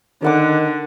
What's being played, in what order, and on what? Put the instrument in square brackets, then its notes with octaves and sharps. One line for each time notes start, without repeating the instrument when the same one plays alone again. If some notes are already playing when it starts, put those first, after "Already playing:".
[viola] D3 [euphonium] D#3 [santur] D5 F#5 D6